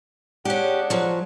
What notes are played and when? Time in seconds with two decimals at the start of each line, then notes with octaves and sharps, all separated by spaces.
0.45 G#3 C#4 D4 G4 F#5
0.90 F3 F#3